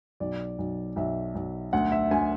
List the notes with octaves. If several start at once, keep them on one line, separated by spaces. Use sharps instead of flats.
B1 D5
B1
B1 E5
B1
D2 F#5
E5
D2 G#5